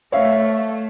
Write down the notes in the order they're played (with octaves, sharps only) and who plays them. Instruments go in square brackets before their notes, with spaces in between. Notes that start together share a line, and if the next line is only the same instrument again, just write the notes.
[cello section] A3 [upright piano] C#5 E5 F5